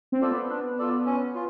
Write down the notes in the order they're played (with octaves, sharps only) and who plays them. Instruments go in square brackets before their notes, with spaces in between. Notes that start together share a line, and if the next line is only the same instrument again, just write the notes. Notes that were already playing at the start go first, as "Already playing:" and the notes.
[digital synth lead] C4
[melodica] F4 A4 D5
[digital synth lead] B3
[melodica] D4
F4 A4 D5
C#4
F4